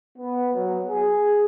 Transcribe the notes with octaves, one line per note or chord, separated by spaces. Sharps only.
B3
F#3
G#4